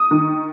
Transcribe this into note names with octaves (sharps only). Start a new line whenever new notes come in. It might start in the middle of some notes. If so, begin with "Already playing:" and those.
Already playing: D#6
D#3